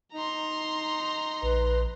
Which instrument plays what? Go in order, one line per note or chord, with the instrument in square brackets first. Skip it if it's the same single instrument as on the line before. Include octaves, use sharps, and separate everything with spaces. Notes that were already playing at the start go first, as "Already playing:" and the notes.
[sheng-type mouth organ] D#4 [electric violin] A#5 C6
[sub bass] A#1 [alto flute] B4